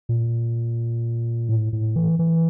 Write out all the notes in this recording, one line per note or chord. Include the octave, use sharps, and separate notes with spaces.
A#2
A2
A2
E3
E3